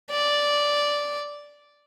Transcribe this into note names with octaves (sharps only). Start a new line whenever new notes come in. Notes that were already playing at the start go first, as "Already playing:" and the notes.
D5